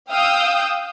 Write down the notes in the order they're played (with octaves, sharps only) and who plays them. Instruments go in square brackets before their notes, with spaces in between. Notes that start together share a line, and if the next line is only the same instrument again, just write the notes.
[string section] F5 G5 D#6 E6 G6